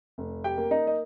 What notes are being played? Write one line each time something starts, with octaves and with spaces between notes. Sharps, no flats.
F1
G4 G5
A#3
D#4 D#5
D#5